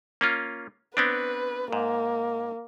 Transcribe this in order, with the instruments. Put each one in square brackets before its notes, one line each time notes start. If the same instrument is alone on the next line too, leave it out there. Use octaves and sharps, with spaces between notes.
[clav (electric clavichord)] A#3 C#4 F4
[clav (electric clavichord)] B3 C4 D4 [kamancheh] B4
[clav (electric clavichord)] G#2 [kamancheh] A#3